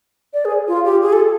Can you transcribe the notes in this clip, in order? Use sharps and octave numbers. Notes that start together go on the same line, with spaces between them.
D5
G#4
F4
G4
G#4
A4